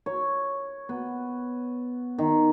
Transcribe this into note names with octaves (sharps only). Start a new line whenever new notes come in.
C#5
B3
D#3